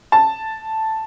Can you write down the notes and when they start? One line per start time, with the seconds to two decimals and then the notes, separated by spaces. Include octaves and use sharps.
0.12 A5